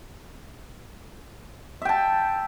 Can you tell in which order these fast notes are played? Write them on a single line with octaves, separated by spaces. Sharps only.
E5 G5 A5